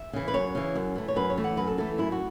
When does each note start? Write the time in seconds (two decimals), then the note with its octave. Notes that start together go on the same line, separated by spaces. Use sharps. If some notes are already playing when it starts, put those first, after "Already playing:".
Already playing: E5
0.13 C#3 E3
0.28 B4
0.34 F#2 C#5
0.55 C#3 E3
0.75 F#2
0.95 E3 A3
1.08 C#5
1.16 F#2 B4
1.30 C#5
1.37 E3 A3
1.44 F#5
1.57 F#2 B4
1.67 A4
1.78 E3 A3 A4
1.98 F#2 E4
2.12 F#4